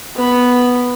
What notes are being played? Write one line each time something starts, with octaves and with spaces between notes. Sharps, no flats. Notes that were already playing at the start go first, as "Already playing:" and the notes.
B3 B5